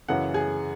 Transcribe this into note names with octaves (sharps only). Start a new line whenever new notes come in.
F#2 C#3 E3 F#5
G#4